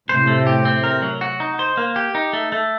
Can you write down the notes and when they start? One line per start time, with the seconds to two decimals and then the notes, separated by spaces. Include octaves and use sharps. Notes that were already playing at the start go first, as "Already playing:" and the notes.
0.09 A2 C3 C5
0.27 A3
0.47 G4
0.65 C4
0.84 A#4
1.02 F#3
1.21 F#4
1.40 D#4
1.59 C5
1.77 A#3
1.96 G4
2.15 D#4
2.33 A3
2.52 A3